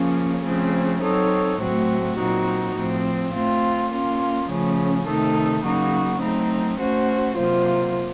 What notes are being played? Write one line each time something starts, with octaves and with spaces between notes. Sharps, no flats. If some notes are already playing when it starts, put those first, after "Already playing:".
Already playing: C#3 F3 A#3 C#4
C#3 F3 A3 C4
F#3 C4 D#4 A4 C#5
A2 F#3 A3 C4 F#4
A#2 F#3 C4 D#4 F#4
A2 F3 C4
A3 C4 F4
A#3 C#4 F4
C#3 F3 A3 C#4
C3 D#3 A3 D#4 A4
C#3 F#3 A#3 D#4 F#4
F#3 A3 C4 D#4
A3 C#4 F#4 C5
C3 F#3 A#3 F4 C5